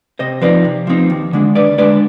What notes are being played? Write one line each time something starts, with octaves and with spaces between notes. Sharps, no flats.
C3 C5 D#5
F3 C4 D#4 B4 D5
C3
F3 C4 D#4
D#2
D3 G#3 D4
D#2 B4 D5
D3 G#3 D4 B4 D5